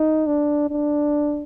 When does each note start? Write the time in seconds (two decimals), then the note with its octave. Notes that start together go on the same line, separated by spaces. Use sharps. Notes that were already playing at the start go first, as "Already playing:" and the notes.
Already playing: D#4
0.27 D4
0.69 D4